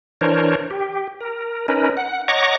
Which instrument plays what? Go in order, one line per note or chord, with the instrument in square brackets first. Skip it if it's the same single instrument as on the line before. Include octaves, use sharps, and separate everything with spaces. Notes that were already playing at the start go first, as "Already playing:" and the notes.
[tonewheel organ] E3 D4 A#4 C5 C#5
G4
A#4
C#4 D#4 A#4 B4
F#5
C#5 D#5 F#5 A#5 C#6 D6